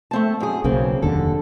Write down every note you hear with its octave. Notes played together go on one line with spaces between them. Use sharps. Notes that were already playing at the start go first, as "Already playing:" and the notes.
A3 C4 A5
F#2 G#4
B1 C#3 A#3 C4
F1 D#2 D3 A4